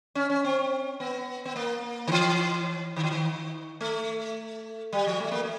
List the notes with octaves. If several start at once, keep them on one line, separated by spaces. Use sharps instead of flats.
C#4
C#4
C4
B3
B3
A#3
D#3
E3
D#3
E3
D#3
A3
G3
F3
A3
A#3
A3